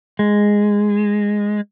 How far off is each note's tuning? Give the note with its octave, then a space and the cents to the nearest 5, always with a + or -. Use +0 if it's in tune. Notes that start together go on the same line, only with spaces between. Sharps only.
G#3 -5